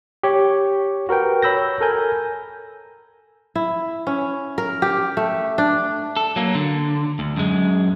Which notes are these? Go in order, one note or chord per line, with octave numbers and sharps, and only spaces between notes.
G4 C#5
F#4 A#4 B4 G5
C#5 B5 E6 G6 A#6
A4 A#4 G#5 G6
E4
C#4
A#4
G4
A3
D4
A4
F#3 A#3
D3
D2
F#2 G#3